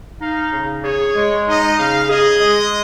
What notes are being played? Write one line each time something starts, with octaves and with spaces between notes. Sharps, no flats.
D#4 F5
C#3
G#4 C#5
G#3
D#4 D#5
C#3 F5
G#4 D#5
G#3